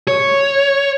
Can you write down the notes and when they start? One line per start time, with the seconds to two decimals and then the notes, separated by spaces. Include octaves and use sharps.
0.08 C#5